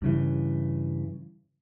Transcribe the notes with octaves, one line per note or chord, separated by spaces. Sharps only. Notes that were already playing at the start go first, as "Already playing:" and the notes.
G2 C#3 E3